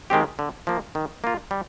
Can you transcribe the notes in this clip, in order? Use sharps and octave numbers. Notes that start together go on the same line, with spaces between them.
D#3 G#3 C4 G4
D3
F3 A#3
D#3
A#3 F4
G3